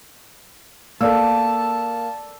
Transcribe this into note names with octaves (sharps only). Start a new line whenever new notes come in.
A#3 A4 D5 A5 E6